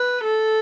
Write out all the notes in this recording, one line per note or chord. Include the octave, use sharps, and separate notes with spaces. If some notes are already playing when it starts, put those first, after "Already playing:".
Already playing: B4
A4